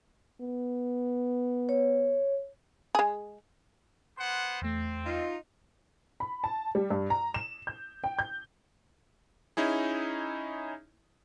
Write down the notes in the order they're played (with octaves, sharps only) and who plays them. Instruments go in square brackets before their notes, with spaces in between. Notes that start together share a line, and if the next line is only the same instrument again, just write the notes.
[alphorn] B3
[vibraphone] C#5
[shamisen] G#3 G#4
[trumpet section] B3 C5 F#5 [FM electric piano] C6
[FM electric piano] E2 A3 [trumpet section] C4
[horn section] D#4 F4
[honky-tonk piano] B5
A5
G3
G2
A#5
E7
G6
G5
G6
[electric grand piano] C#4 D#4 E4 G#4